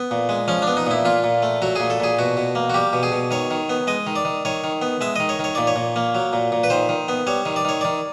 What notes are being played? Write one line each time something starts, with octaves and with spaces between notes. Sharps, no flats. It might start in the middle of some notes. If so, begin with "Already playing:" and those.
Already playing: B3
A#2
G#3
F3 C#4
D4
B3
D#4
A#2 E4
A#2 F4
A#2
A3
F#3 F#4
A#2 G#4
A4
A#2 G#4
B2 F#4
B2
A#3
F#4
G3 G4
B2
G#4
B2
D#3 C#5
D#3
B3
G#3 D#5
D#3
D5
D#3
D#3 C#5
D#3
B3
G#3 E5
D#3 D#5
C#5
D#3 C#5
A#2 D5
C#5
A#2
A#3
F#3
A#2
A#2
B4
D#3 C5
D#3
B3
G3 C#5
D#3
D5
D#3 C#5
D#3 D5